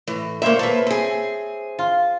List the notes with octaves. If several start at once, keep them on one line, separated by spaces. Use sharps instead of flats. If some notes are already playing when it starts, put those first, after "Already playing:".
A2 E3
A#2 A#3 C5 C#5 E5
A#3 A4 B4 E5
C4 G#4
F4